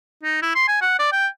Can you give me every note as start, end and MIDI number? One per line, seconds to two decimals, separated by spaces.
0.23 0.41 63
0.42 0.53 64
0.55 0.65 84
0.68 0.77 80
0.81 0.98 78
0.99 1.08 74
1.12 1.27 79